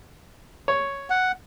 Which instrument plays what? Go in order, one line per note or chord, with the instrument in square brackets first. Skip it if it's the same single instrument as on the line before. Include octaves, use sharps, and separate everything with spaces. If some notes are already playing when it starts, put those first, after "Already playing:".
[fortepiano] C#5
[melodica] F#5